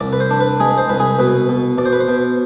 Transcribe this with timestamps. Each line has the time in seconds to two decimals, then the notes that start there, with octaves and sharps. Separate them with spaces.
0.01 C2 D5
0.13 B4
0.20 C5
0.31 D4
0.41 B4
0.60 G#3 G#4
0.78 C5
0.89 C2 B4
1.00 G#4
1.19 B2 B4
1.49 B2
1.78 B2 D5
1.86 C5
1.93 B4
2.00 C5
2.08 B2